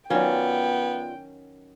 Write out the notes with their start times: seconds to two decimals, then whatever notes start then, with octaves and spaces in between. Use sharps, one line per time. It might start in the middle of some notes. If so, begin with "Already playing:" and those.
0.10 D#3 F#3 B3 C#4 F4 D5 G5